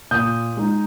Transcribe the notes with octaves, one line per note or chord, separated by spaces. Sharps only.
A#2 D#6 G6
G#3 D#4